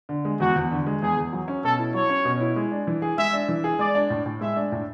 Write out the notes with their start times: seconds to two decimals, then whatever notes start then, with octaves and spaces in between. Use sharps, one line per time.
0.09 D3
0.25 G#3
0.40 E2 F#4
0.56 E2
0.71 D3
0.86 G#3
1.02 E2 G#4
1.17 E2
1.33 F#3
1.48 C#4
1.64 B2 A4
1.79 E4
1.94 F#3 C#5
2.09 C#4
2.25 B2
2.41 E4
2.56 G#3
2.72 D4
2.87 E3
3.02 G#4
3.17 G#3 E5
3.33 D4
3.49 E3
3.64 G#4
3.79 G#3 D5
3.95 D4
4.10 A2
4.26 A2
4.41 G#3 E5
4.56 D4
4.72 A2